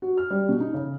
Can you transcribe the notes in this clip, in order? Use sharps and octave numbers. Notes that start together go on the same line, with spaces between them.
F#4
F6
G3
B2
D#4
C#3